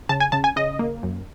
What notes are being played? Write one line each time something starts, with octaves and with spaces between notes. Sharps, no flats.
C#3 A5
G#5
C#3 A5
G#5
C#3 D#5
A#3
F#2